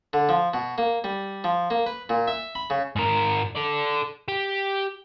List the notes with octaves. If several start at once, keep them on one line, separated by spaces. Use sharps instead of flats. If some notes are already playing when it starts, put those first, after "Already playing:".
D3
F3
B2
A#3
G3
F3
A#3
B4
A#2
E5
B5
C#3
G#2 A#4
A4 D5
G4